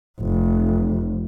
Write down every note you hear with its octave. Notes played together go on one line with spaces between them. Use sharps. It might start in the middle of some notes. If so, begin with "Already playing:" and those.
F1